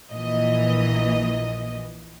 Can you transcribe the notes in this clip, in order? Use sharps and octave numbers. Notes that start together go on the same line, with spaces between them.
A#1 A#2 E3 D#5